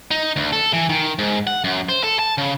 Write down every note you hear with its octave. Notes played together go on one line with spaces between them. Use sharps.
D#4
D2
A4
E3
D#3
G#2
F#5
F#2
C5
A4
A5
C#3